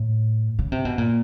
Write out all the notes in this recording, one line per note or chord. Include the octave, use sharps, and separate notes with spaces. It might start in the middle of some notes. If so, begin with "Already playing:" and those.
Already playing: A2
C#3
C3
B2
A#2